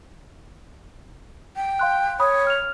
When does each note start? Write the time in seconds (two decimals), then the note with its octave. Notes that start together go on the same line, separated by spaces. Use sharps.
1.56 G5
1.79 F5 C6 F#6
2.20 C#5 B5 D#6
2.47 F6 F7